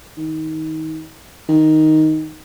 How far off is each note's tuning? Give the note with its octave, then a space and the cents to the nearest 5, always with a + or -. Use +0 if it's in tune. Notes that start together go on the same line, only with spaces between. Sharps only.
D#3 +25
D#3 +5